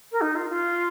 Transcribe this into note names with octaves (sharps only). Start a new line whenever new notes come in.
A#4
D#4
F4
F4